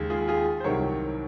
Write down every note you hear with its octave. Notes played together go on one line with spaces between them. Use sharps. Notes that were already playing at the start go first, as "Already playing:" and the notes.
Already playing: D#2 C#3 G#3
F4 G#4
F4 G#4
C5
C2 C3 D#3 F#3 A#4 C#5